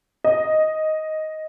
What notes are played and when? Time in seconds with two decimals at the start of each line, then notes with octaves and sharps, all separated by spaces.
0.24 D#5